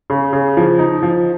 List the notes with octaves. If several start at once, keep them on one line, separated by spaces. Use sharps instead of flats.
C#3
C#3
F3
D#4
F3